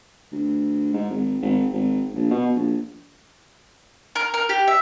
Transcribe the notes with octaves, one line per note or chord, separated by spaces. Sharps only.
D2
G#2
G#1
G#1
G#1
A#1
B2
A#1
A#4
A#4
G4
E5